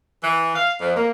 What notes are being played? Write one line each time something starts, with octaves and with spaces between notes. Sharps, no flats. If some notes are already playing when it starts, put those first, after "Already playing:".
E3
F5
F2
A#3